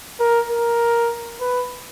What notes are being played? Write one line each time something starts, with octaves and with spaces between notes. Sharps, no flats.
A#4
A#4
B4